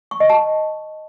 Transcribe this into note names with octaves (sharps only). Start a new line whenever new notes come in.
C#6
D#5
A5